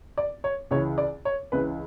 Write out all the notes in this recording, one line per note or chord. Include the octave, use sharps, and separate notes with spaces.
D5
C#5
C#2 C#3 E3 C#5
D5
C#5
C#2 C#3 E3 B4